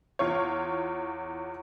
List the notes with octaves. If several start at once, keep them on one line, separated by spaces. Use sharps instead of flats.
E2 F4 C#5